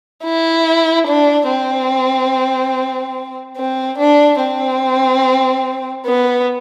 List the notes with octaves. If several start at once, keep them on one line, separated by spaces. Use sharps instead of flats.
E4
D4
C4
C4
D4
C4
B3